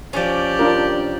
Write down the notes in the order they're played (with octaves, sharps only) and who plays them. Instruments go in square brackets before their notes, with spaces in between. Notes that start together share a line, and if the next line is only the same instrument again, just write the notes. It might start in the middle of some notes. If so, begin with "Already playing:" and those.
[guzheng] F3 C#4 [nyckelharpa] G4 D5
[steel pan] D4 F4 A#4